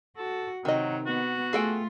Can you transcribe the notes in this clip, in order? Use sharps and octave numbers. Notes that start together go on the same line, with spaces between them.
F#4 A4
C3 D#3 F#3 D#4 D#5
B3 F#4
A3 F4 G#4 A4 G5